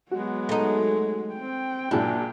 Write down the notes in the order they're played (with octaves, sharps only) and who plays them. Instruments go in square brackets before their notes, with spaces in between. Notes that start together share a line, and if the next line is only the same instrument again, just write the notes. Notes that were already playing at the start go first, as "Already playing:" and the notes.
[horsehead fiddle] F#3 G#3 [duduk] B3 [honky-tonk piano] F#4
[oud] A3 D#4
[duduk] C4 [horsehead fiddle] G5
[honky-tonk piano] A#2 F#3 G#3 [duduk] D4 [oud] E4